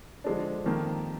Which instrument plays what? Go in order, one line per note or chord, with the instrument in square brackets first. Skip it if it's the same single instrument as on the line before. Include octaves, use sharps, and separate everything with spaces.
[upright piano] D3 F3 G#3 D4
F2 D#3 A#3